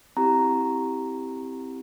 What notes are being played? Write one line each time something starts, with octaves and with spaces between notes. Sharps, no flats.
C4 E4 G4 A#5